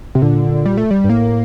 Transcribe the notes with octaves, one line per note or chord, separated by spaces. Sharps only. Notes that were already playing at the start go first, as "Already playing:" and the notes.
C3
A#2 D3
G3
A3
G3
G2
A2 A#3